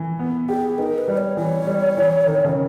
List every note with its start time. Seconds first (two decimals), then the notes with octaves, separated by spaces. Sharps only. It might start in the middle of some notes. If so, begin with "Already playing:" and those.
Already playing: E3
0.19 B3
0.49 G4 G#4
0.78 D#4 B4
0.82 A#4
0.98 B4
1.08 G3
1.17 C#5
1.37 E3 C#5
1.67 G3
1.97 E3
2.26 D#3
2.44 C#3